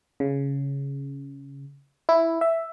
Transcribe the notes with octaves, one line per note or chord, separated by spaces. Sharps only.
C#3
E4
E5